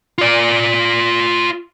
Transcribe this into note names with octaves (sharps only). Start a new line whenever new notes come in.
F4 D5